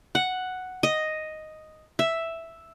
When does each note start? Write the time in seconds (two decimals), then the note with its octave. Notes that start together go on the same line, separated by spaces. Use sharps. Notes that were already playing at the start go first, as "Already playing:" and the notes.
0.15 F#5
0.83 D#5
1.99 E5